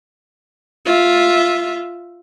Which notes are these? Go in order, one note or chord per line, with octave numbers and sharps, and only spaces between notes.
F4 E5